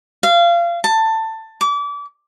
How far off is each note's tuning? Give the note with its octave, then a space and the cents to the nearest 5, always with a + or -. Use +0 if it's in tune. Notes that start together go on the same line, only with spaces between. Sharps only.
F5 -25
A5 +15
D6 -30